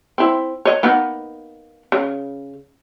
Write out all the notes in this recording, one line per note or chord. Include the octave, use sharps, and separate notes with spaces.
C4 E4
C#5 D#5
A#3 B3 D#4
C#3